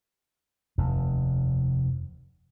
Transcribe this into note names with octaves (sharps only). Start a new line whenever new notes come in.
F1 D#2